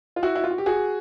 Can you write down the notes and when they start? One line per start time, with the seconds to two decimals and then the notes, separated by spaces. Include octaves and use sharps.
0.16 F4
0.23 E4 F#4
0.35 E4
0.44 F4
0.51 F#4
0.58 G4
0.66 F#4 G#4